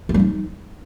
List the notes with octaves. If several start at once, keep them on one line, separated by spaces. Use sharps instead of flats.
A3
G3
D#4